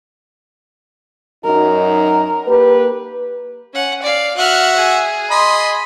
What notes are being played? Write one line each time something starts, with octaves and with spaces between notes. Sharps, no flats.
F#2 F#3 D#4 A#4
A#3 G4 B4
C#4 F#5
D5 F5
F#4 E5 F6 F#6
G#4
D#5 B5 C6